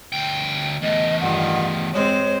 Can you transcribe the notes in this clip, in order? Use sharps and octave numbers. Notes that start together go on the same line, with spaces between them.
D2 G5
E2 A2 D#5
G2 D#3 F4 F#5
G#3 C4 C5 C#5